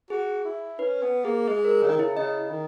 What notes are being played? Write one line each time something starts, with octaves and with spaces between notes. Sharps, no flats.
F#4 G#4
E4
C#4 B4
B3
A#3 G#4
G#3 G#4
A#4
C#3
D#3
C#3 E4
C#3 D#5
D#3